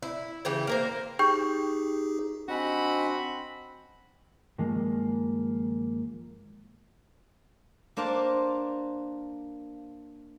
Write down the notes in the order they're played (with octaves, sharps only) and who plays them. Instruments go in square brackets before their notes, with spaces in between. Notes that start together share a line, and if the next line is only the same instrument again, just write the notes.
[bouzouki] E4
C#3 E3 G4
A#3 A#4 C5
[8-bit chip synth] D#4 G4 G#4 [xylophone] G5 C#6 G6
[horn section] C4 F#4 B5 [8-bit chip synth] D4 D#5 G#5
[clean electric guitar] G2 D#3 F3 G#3 A#3
[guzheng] A#3 D4 C5 F5 A5